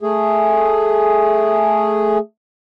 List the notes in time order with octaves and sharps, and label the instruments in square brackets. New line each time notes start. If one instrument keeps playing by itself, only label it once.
[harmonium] A3 G#4